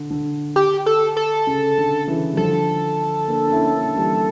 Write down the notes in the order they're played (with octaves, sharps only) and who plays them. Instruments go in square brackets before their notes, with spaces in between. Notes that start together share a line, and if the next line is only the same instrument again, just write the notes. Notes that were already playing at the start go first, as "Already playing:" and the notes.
Already playing: [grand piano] D3
D3
[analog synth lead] G4
A4
A4
[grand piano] C#3
D3
C#3 E3
G3
[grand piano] D3 F3 [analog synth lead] A4
[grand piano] A#3 D4
D4
C#4 E4
A#3 D4
E3 G3